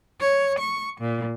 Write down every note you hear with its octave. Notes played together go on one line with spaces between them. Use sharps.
C#5
C#6
A#2